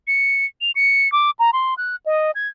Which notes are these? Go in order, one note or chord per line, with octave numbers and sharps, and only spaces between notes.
C#7
F7
C#7
D6
A#5
C6
F#6
D#5
G#6